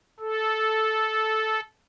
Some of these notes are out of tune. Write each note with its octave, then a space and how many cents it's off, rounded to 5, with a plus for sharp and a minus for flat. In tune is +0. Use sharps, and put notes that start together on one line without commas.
A4 -10